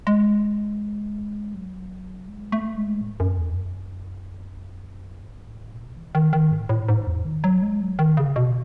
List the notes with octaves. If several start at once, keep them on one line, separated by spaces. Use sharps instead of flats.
G#3
F#3
G#3
A3
G#3
A2
F#2
E2
F#2
G#2
A2
B2
E3
D#3
D#3
G#2
A2
G#2
E2
D#3
F#3
G#3
F#3
D#3
C#3
B2